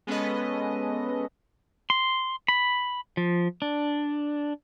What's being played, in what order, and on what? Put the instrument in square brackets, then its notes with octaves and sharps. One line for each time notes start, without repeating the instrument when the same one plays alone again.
[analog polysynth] G#3 B3 C#4 A4 B4 D#5
[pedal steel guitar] C6
B5
F3
D4